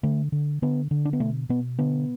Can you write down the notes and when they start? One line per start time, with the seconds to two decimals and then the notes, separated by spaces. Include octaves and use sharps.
0.03 D3 A3
0.32 D3
0.62 D3 B3
0.91 D3
1.05 D4
1.13 B3
1.20 B2 A3
1.49 B2 B3
1.79 D3 B3